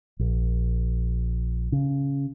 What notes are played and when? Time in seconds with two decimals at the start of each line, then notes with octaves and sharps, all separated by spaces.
0.19 A#1
1.72 C#3